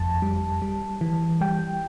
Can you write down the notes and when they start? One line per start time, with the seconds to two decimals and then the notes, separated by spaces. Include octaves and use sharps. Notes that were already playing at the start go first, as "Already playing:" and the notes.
Already playing: G1 F2 A5
0.22 G3
0.62 G3
1.01 E3
1.41 G3 G5